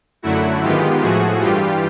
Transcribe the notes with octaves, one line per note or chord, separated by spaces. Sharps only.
F#2 D3 F#3 A3 E4 F#4
G#2 D#3 G#3 B3 F4 G4
A2 F3 A3 F#4 G#4
G2 E3 G3 F4 G4